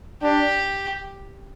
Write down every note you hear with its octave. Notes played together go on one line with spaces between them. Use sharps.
D4 G4